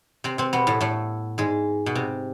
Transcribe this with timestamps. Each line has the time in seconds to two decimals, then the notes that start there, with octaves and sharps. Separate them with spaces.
0.24 C3 C4
0.38 C3 C4
0.53 B2 B3
0.67 A2 A3
0.81 A2 A3
1.38 G#2 G#3
1.86 B2
1.95 C3